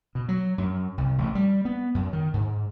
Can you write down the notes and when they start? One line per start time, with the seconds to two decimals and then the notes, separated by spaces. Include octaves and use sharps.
0.15 B2
0.29 F#3
0.58 F#2
0.98 C2
1.18 A1
1.35 G3
1.65 B3
1.95 F#2
2.13 D#3
2.34 G#2